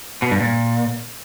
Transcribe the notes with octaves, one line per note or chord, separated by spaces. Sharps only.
B2
G2
A#2